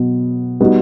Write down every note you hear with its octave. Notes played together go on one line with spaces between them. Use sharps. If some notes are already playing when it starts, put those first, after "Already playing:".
Already playing: B2 F#3 B3
G3 B3 D#4 F#4